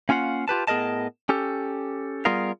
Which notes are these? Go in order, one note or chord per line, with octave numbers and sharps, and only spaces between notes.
A#3 C#4 F4 F5 F#5
F4 G4 B4 A5
A2 B3 G#4 A#4 D#5 A5
C#4 G4 A4
G3 B3 F4 G#4 A#4 F5